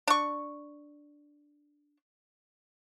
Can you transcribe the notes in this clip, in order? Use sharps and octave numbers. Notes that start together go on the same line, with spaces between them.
D4 C#6